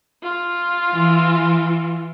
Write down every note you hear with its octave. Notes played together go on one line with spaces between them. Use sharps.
F4
E3